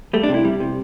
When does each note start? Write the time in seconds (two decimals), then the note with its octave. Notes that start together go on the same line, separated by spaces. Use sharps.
0.13 G3 A3
0.23 D4
0.29 C3
0.34 E4
0.45 G3
0.60 C3